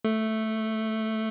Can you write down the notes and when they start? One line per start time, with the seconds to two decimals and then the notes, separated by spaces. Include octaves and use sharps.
0.05 A3